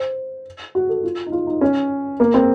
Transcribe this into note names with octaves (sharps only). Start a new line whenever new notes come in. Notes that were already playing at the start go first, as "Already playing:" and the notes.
Already playing: C5
F#4
A4
F4
D#4
F4
D#4
C#4
A#3
C4